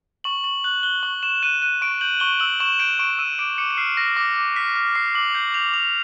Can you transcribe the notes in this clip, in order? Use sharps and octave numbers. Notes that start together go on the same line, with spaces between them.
C#6 F#7
C#6 F#7
F#6 F#7
F#6 G7
C#6 F#7
C#6 E7
F#6 D#7
F#6 D#7
C#6 D7
G6 F#7
C#6 G7
E6 F#7
C#6 E7
G6 D7
C#6 D7
E6 D#7
D6 D7
D6 C#7
C#7
F6 C7
F6 A#6
D6 A#6
D6
F6 B6
F6
D6 C7
D6 F#7
G6 C7
G6 F7
D6 F7